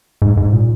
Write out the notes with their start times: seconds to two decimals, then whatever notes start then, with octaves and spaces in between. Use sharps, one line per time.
0.22 G#2
0.37 G#2
0.53 A#2